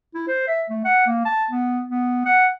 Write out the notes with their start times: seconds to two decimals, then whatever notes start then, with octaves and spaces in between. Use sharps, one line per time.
0.15 E4
0.28 C5
0.48 E5
0.70 A3
0.85 F#5
1.06 A#3
1.25 A5
1.51 B3
1.88 B3
2.26 F#5